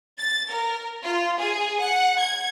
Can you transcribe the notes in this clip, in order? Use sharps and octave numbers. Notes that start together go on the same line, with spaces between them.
A6
A#4
F4
G#4
F#5
G#6